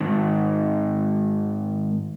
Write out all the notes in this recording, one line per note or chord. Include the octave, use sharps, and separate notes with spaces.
G#2 D#3